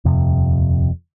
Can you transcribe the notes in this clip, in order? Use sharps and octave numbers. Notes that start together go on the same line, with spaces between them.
D#1 F2 C3